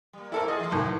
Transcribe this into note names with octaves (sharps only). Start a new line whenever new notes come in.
G3 A#3
A3 C4 E4 A4 A#4
F4 G#4 D#5
E3 A3
B1 A2 D#3